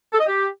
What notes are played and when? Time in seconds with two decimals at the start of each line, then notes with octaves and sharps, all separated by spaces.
0.13 A4
0.20 D#5
0.27 G4